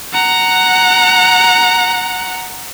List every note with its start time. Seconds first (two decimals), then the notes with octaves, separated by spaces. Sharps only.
0.14 F#5 A#5